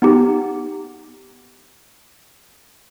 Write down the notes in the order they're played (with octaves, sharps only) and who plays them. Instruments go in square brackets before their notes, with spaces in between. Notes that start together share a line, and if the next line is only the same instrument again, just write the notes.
[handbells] B3 D#4 G4